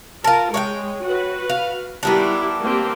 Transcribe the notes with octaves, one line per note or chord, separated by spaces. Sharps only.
F4 A#4 A5
G#3 C#5 F5 G5
F#4 B4
F5
D#3 G3 B3 D4 E4
A#3 C4 G4